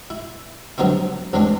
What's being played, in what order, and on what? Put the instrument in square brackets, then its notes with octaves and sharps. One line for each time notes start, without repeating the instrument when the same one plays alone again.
[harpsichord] E4
G2 D3 F#3 B3 C4 E4
A1 E2 G#2 G#3 C4 D4